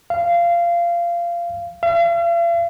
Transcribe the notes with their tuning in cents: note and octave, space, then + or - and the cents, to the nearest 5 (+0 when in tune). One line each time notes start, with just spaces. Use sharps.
F5 -20
F5 -45